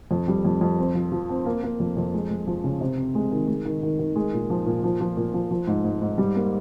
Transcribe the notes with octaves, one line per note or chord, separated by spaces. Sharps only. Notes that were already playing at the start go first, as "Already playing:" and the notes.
F2
G3
F2
F2
C4
F3
F3
C4
A#3
A#3
F2
F2
G#3
G#3
F3
C#3
C3
C4
G#3
D#3
G#3
D#3
D#3
D#3
G#3
A#2
F3
A#2
F3
F3
A#2
F3
F3
G#2
G#2
G#2
G3
A#3